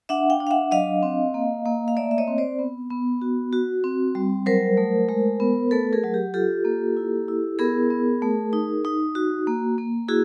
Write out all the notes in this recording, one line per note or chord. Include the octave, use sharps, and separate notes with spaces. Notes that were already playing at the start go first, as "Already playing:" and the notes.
D4 E5 F#5
F5 G5
D4
F5
E5 F#5
F#3 D#5 F5
C4
A#3
A#3
F5
A3 D5 E5
E5
C#5 D#5
C4
C5 D5
B3
B3
F#4
F#4
C4
G3
F#3 A#4 C5
A3
G#3
B3
A3 A4 B4
G#4 A#4
F#3
G4
F4 G4 A4
A#3
E4
E4
B3 G#4 A#4
B3
A3
D#4
D#4
F#4
A#3
A#3
E4 F#4 G#4